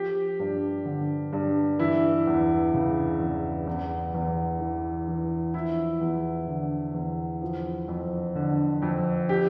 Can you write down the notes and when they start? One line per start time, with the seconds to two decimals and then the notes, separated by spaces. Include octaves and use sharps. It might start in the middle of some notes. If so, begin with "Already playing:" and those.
Already playing: F3 G4
0.40 G2
0.85 D3
1.33 G2
1.79 E3 E4
2.27 E2
2.74 C#3
3.20 E2
3.67 E2
4.14 E2
4.60 E3
5.08 E3
5.54 F3 E4
6.01 E2
6.47 D3
6.94 E2
7.42 F3
7.88 F2
8.36 D3
8.82 F2
9.29 G4